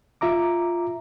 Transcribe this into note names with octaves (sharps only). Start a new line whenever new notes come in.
F4 E5 A#5 D6